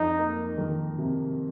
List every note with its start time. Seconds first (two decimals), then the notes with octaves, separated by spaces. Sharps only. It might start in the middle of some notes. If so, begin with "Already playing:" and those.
Already playing: F2 D#4
0.19 A#3
0.58 D#3
0.98 C3